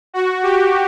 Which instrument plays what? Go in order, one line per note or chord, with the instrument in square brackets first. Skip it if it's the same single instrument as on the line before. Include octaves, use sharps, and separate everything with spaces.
[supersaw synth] F#4
G4